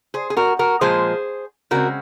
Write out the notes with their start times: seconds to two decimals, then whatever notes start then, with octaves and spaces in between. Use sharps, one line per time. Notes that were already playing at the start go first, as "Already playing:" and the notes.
0.14 G#4 C5
0.30 G#4
0.37 F#4 A#4
0.59 F#4 A#4
0.81 A#2 F3 G#3 G#4 C5
1.71 C#3 G#3 C4 F#4 A#4